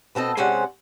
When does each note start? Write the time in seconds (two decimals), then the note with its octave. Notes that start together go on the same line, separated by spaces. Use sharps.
0.15 B2 C4 A4 D#5
0.37 C3 G#3 C4 C#4 D5 F#5